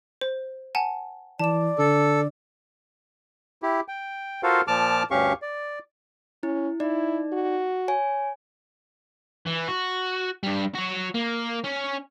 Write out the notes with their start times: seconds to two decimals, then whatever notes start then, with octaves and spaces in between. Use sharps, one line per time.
0.21 C5
0.75 F#5 G#5 A5
1.39 E3 D5 A5 E7
1.78 D3 A4
3.62 E4 G4
3.88 G5
4.43 F4 F#4 A4 A#4 C5 F5
4.68 A#2 F3 A5 D6 F6
5.11 D2 G2 C#4 G4 F5 C#6
5.42 D5
6.43 C#4 E4
6.80 D#4 E4 D5
7.33 F#4
7.88 C#5 G#5
9.46 E3
9.68 F#4
10.43 G2 G3
10.75 F#4 C#5
11.15 A#3
11.64 C#4